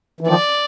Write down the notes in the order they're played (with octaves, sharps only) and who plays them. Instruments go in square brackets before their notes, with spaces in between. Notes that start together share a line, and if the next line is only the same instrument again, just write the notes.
[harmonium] E3
[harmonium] D#3 F3 [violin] D5